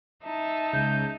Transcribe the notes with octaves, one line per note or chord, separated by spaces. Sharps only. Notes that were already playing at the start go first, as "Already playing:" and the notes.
D#4 E5 A5
C#2 C#3 G6